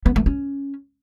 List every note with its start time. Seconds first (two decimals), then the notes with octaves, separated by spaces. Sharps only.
0.06 B3
0.16 A3
0.26 C#4